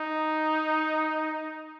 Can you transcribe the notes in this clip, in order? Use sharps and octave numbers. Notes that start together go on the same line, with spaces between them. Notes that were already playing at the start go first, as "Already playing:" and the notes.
Already playing: D#4